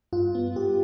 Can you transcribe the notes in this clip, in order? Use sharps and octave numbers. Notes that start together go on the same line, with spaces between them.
G2 F4
B3
G2 G4